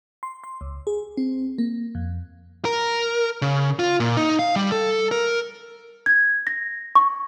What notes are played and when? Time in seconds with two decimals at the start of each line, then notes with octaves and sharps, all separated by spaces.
0.23 C6
0.44 C6
0.61 C#2
0.87 G#4
1.17 C4
1.58 A#3
1.95 F2
2.65 A#4
3.42 C#3
3.79 F4
4.00 A#2
4.17 D#4
4.39 F5
4.56 G3
4.72 A4
5.11 A#4
6.06 G#6
6.47 A#6
6.95 C#6